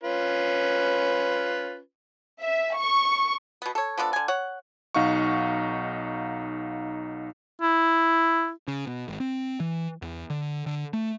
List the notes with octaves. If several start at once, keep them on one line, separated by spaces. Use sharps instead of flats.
C#4 F4 B4
E5
C#6
B2 B3
A4 C#5
F3 B3 D4 A4
D3 G#5
C#5 F#5
B1 D#4 F5 F#5 C#6
E4
C#3
B2
G#1
C4
E3
E2
D3
D3
A3